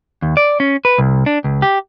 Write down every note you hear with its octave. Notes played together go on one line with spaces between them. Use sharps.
D#2
D5
C#4
B4
C2
D4
C#2
G4